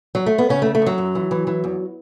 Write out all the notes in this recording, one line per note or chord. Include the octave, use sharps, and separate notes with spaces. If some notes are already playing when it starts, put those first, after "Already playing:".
F#3
A3
B3
C#3 C#4
A3
C#3
A3
F#2 F#3
F#2
E3
E3
E3
E2